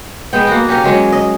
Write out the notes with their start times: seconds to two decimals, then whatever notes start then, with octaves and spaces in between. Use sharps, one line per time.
0.33 G#3 B3 G5
0.47 A#3 F#4
0.68 C#4 G4 A#4
0.84 F#3 G#3 C#4
1.12 D#5